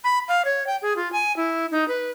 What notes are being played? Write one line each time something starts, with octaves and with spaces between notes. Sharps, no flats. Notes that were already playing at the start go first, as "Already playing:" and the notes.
B5
F5
C#5
G5
G#4
F4
G#5
E4
D#4
B4